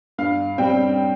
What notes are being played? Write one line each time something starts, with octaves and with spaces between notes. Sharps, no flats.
G2 F5
G3 C4 G5